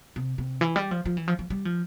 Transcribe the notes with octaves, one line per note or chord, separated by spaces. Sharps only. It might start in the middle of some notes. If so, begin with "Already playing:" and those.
C3
C3
E3
G3
F3
F3
E3
F3
F3
G3
F3